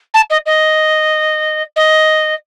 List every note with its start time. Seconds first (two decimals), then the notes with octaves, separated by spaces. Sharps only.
0.14 A5
0.30 D#5
0.46 D#5
1.76 D#5